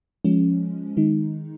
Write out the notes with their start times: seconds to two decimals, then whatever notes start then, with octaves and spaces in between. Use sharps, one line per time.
0.25 F3 G#3 C#4
0.97 D#3 G#3 D#4